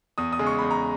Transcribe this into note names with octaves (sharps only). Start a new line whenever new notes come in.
E2 D#6
D#6
C#3 G#3
C#6
E2 B5
A#5